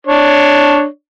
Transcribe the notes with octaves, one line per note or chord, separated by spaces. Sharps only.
D4 C#5